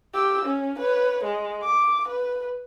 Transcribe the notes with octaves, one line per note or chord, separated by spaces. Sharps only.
G4 E6
C#4
B4 C#5
G#3
D6
B4